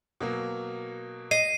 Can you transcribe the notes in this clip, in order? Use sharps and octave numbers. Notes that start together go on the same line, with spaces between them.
B2 F#3 A#3
D#5 C7 D#7